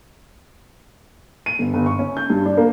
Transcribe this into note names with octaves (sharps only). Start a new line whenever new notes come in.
D#7
G1
G1
C#6
C#4
G6
G2
D4
A#3